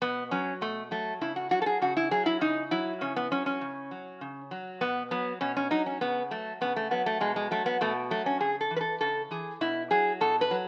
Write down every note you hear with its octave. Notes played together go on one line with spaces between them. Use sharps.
B2 B3
F#3 C#4
B2 A3
F#3 A3
C#3 E4
F#4
F#3 F#4
A4
G#4
C#3 F#4
E4
F#3 G#4
E4
C#3 D#4
F#3 E4
C#3 C#4
B3
F#3 C#4
C#4
C#3
F#3
C#3
F#3
B2 B3
F#3 B3
B2 C#4
C#4
F#3 D#4
C#4
C#3 B3
F#3 A3
C#3 B3
A3
F#3 B3
A3
B2 G#3
G#3
F#3 A3
B3
B2 A3
F#3 A3
C#4
C#3 G#4
A4
E3
B4
A4
C#3 A4
E3 G#4
B2 E4
F#3 G#4
B2 A4
B4
F#3